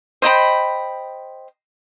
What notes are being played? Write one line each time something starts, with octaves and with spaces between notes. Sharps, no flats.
C5 D#5 G5 B5